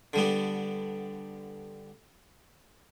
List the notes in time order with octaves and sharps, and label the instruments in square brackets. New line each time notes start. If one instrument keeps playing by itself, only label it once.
[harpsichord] D3 G3 B3